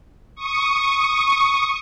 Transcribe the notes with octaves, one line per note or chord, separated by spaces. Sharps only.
C#6 D#6